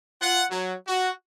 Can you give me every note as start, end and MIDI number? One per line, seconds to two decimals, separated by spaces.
0.20 0.42 65
0.20 0.42 78
0.51 0.74 54
0.86 1.12 66